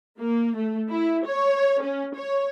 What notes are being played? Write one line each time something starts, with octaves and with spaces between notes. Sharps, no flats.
A#3
A3
E4
C#5
C#4
C#5